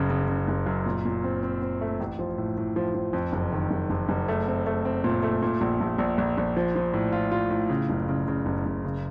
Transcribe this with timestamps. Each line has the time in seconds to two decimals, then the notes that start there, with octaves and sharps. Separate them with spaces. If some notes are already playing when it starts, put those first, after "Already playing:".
Already playing: F#1 C#3
0.10 C#3
0.28 C#3
0.48 F#1
0.67 F#2
0.86 A#2
1.05 A#2
1.24 C4
1.43 C4
1.62 C4
1.81 A3
2.00 A1
2.19 F3
2.38 A2
2.57 A2
2.76 F3
2.95 F3
3.13 F2
3.33 F#1
3.52 D#3
3.71 F#1
3.90 F#1
4.09 F#1
4.28 A3
4.48 C4
4.67 A3
4.85 C4
5.04 A#2
5.23 A3
5.43 A#2
5.61 A#1
5.81 A#1
5.98 A#1
6.18 A#1
6.38 A#1
6.57 F3
6.76 F3
6.94 A2
7.13 F4
7.32 F4
7.51 A2
7.70 C#3
7.89 F#1
8.09 C#3
8.28 C#3
8.46 F#1
8.66 F#1
8.85 C#3